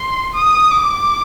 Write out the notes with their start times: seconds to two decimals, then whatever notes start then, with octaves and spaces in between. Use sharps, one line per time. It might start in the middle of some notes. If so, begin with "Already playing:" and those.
Already playing: C6
0.34 D#6
0.71 D6